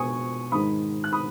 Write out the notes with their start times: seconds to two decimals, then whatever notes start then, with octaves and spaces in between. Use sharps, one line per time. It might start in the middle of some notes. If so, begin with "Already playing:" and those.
Already playing: B2 G#3 G#5 C#6 D#6
0.52 G#2 D#3 G#3 B5 D#6
1.04 F#6
1.13 B5 D#6